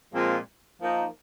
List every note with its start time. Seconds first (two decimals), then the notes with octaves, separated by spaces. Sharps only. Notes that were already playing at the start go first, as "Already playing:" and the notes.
0.13 A#2 F3 G#3 C4 F4
0.81 F3 A#3 D#4